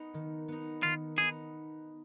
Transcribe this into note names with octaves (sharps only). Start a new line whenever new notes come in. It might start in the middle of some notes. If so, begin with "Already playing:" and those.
Already playing: B3 D#4
D#3
B3 D#4
D#3 F4
B3 D#4 G#4